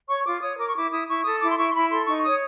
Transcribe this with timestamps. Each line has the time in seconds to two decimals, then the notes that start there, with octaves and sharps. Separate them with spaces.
0.09 C#5 C#6
0.25 F4 D6
0.42 C#5 D#6
0.58 A#4 D6
0.70 C#6
0.76 E4 D6
0.91 E4 D#6
1.08 E4 C#6
1.25 A4 D#6
1.41 E4 D6
1.50 C6
1.58 E4 C#6
1.70 C6
1.74 E4 B5
1.90 A4 C6
2.07 D#4 C#6
2.24 C#5 D#6